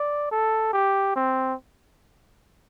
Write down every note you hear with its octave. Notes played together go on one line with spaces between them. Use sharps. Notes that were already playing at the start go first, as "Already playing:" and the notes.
Already playing: D5
A4
G4
C4